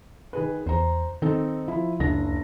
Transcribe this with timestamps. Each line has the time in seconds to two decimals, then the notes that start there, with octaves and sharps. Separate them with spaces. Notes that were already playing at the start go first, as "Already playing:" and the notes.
0.33 D#3 G#4 B4
0.66 E2 C5 A#5
1.22 D#3 C4 D#4 A4
1.68 F3 E4
2.00 F#1 C#2 D4 A#6